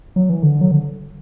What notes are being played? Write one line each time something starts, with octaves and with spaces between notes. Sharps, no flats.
F#3
E3
D3
F#3
D3